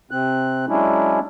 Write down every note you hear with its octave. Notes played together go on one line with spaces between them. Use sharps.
C3 C4 F#6
F#3 G#3 C#4 D4 E4